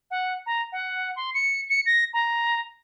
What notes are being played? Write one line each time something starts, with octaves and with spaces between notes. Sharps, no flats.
F#5
A#5
F#5
C6
C#7
C#7
A#6
A#5